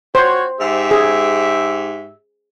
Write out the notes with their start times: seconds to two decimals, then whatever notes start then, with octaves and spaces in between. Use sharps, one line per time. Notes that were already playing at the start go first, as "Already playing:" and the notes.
0.15 F#4 C5 C#5
0.60 G#2 G4 E5
0.91 G#4